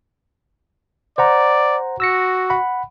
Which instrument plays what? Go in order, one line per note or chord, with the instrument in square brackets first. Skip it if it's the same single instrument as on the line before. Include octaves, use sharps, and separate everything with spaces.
[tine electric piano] C5 F#5 A#5 [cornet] D5
[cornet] F#4 [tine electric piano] E6 A#6 C#7
[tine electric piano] F#5 B5